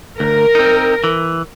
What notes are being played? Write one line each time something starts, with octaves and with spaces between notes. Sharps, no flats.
D2 A#4
C4 D#4
E3